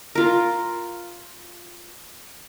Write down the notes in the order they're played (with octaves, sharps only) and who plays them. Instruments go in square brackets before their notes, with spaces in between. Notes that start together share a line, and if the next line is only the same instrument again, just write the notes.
[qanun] F4 A#4